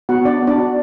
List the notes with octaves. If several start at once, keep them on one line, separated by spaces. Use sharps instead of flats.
B3 F#4 F#5
D4 D5
B3
D4 D5
F#4